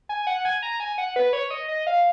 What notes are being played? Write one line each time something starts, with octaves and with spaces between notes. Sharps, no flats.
G#5
F#5
G#5
A#5
G#5
F#5
B4
C#5
D#5
D#5
F5